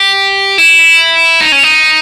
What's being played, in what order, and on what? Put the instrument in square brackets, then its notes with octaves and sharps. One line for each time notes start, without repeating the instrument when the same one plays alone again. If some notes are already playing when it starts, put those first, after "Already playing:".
Already playing: [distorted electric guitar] G4
E4
D#4
C#4
D#4